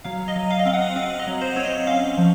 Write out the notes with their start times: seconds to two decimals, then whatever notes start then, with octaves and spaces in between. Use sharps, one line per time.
0.04 F#3 F5
0.28 D#5
0.36 F#3
0.50 F5
0.59 D#5
0.65 C4 F5
0.73 F#5
0.96 C4 F5
1.19 D#5
1.27 F#3
1.41 C5
1.56 C4 C#5
1.65 D#5
1.87 C#4 F5
2.17 F3